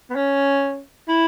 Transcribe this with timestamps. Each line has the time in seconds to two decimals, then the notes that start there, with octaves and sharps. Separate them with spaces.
0.10 B3
0.15 C#4
1.09 E4